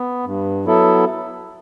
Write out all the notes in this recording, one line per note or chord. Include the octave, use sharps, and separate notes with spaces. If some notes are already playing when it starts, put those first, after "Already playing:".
Already playing: B3
G2
F#3 B3 E4 A4